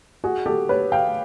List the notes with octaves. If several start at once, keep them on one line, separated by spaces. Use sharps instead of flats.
F#4 G#4
G4 A4
B4 C#5
F5 G5